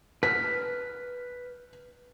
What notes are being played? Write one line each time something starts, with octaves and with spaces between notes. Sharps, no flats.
B4 F6 B6